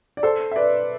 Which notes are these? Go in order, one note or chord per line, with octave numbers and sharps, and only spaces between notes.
D5
A4 C5
E5
B4 D5